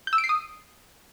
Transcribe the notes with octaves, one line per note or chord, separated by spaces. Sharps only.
G6
E6
D7
C7
D#6